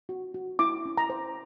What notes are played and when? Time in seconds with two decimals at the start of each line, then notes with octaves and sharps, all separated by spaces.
0.09 F#4
0.34 F#4
0.59 E4 D6
0.85 C#4
0.98 A#5
1.10 C5